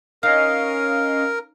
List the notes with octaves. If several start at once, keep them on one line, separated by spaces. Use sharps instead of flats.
C#4 D#4 A#4 D#5 F5 F6 C7